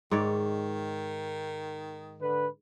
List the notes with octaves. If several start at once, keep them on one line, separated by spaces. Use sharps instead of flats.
G#2 D#3 C#5 D5
D3 B4